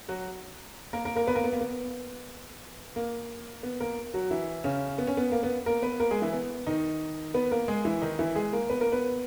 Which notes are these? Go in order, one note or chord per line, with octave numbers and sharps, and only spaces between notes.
F#3 F#4
A#3 A#4
A#3 A#4
A#3 A#4
B3 B4
A#3 A#4
B3
A#3
B3
A#3
B3
A#3 A#4
F#3 F#4
E3 E4
C#3 C#4
B3
C#4
B3
A#3
B3
A#3 A#4
B3 B4
A#3 A#4
G#3 G#4
E3 E4
B3
D#3 D#4
B3 B4
A#3 A#4
G#3 G#4
E3 E4
D#3 D#4
E3 E4
G#3 G#4
A#3 A#4
B3 B4
A#3 A#4
B3 B4